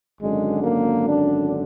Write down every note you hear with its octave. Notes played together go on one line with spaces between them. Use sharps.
G#1 F#2 D3 G#3
A#3
D4